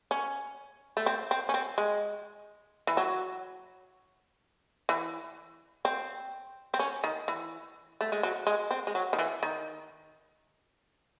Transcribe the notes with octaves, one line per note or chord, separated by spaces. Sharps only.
C#4
A3
C4
C4
C#4
C4
G#3
E3
F#3
E3
C4
C4
C#4
D#3
E3
A3
G#3
F#3
G#3
C4
G#3
F#3
D#3
E3
D#3